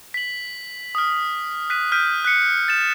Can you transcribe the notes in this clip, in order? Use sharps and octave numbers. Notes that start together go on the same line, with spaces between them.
B6 F#7
D#6 F6
F#6 B6 D#7
F6 G6 B6 D#7
F#6 B6 C#7
A6 E7